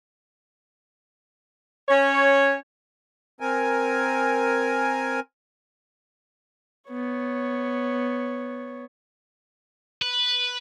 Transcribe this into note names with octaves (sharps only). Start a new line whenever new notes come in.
C#4 C#5
C4 A#4 G#5
B3 C#5
B4